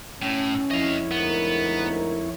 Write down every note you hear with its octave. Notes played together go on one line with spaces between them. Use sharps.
A2 C#4
F2 E4 C#5 D#5 F5
D2 G#2 B3 A#4